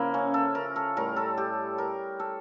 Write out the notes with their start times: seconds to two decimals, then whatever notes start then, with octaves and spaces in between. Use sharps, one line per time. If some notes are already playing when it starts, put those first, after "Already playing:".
Already playing: C#3 F3 A#3 E4
0.14 C#4
0.34 A4
0.55 A#4
0.76 A4
0.97 A2 G3 A#4
1.16 A4
1.38 G4
1.78 A#4
2.20 A4